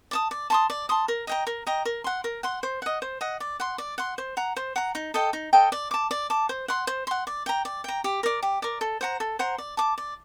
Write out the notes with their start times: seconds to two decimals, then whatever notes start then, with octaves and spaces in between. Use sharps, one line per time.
0.11 D5 A5 D#6
0.31 D5
0.50 A5 C6 D#6
0.70 D5
0.89 A5 C6 D#6
1.08 A#4
1.27 D#5 G5 A#5
1.47 A#4
1.67 D#5 G5 A#5
1.85 A#4
2.04 F#5 C6
2.24 A#4
2.43 F#5 C6
2.63 C5
2.82 D#5 F#5
3.02 C5
3.21 D#5 F#5
3.40 D5
3.60 F#5 C6
3.78 D5
3.98 F#5 C6
4.18 C5
4.37 F#5 A#5
4.56 C5
4.76 F#5 A#5
4.95 D#4
5.14 A4 D#5 G5
5.33 D#4
5.53 A4 D#5 G5
5.72 D5
5.91 A5 D6
6.11 D5
6.30 A5 D6
6.49 C5
6.68 F#5 C6
6.87 C5
7.07 F#5 C6
7.27 D5
7.46 G5 A#5
7.65 D5
7.84 G5 A#5
8.04 G4
8.23 A#4 D5
8.43 G4
8.62 A#4 D5
8.81 A4
9.01 C5 F#5 A#5
9.20 A4
9.39 C5 F#5 A#5
9.58 D5
9.77 A5 D6
9.98 D5